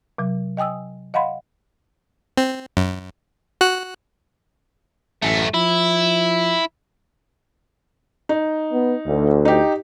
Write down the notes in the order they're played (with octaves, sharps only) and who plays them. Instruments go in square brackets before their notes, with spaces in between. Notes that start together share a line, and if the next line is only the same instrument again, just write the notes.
[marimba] C3 F#3
D#5 G5 G#5 D#6 E6
D#5 F5 F#5 B5 C6
[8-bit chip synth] C4
F#2
F#4 F#6
[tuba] A1 [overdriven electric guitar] F#2 A3
[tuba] F3 [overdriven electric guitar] E4
[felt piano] D#4
[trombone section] B3
D2
[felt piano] D#4 G4